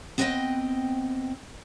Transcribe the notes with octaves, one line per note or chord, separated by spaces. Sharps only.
B3 C4 B4 C5 D#5 G5